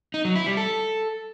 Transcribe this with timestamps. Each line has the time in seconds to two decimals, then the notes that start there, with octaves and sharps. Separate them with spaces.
0.14 D#4
0.25 F#3
0.36 E4
0.46 G3
0.57 A4